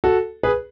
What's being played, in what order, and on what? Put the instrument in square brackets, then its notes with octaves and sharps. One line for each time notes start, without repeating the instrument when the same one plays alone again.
[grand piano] F#4 A4
G#4 B4